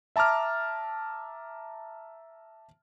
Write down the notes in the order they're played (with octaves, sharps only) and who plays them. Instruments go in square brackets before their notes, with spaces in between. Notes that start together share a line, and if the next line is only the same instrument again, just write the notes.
[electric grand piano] E5 A5 A#5 D6 F6